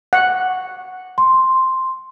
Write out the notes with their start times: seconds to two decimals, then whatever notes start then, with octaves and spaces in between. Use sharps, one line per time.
0.13 F#5
1.18 C6